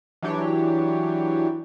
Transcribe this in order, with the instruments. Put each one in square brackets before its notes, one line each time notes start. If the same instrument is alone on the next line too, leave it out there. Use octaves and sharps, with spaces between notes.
[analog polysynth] E3 F#3 D4 G4 C#5